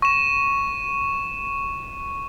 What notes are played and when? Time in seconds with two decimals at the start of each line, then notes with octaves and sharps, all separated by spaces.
0.02 C#6 E7